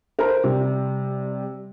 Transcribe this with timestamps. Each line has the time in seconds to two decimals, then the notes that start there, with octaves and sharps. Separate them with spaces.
0.19 A#4 C5 A#5
0.44 C3 G3